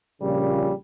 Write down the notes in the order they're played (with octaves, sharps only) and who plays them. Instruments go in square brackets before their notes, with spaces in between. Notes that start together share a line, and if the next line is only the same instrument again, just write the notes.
[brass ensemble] A#1 A#2 C#3 [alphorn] G3